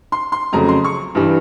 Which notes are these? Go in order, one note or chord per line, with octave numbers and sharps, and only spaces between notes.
C6
C6
F2 C#3 F#3 A3 A#5
C6
C#6
G2 E3 G3